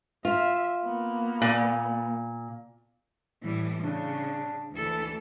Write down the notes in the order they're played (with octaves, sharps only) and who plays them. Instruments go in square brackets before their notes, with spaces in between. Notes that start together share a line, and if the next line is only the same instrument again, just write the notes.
[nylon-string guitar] F4 [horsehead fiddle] E5
[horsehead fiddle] A#3 B3
[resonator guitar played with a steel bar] A#2
[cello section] A2 E3 G3
[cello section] C#3 [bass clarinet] D4
[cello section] D2 E3 A4